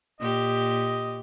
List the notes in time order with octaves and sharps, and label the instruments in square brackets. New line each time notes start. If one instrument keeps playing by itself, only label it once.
[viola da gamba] A#2 G4 [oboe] D#5